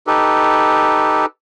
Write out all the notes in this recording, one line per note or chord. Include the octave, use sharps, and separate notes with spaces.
D#4 G4 A4 B4